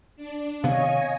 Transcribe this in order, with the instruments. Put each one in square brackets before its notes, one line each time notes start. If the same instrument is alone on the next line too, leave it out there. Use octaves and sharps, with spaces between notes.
[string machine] D4
[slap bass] C3 D#3 B3 [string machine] C#5 D#5 G#5 [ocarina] F5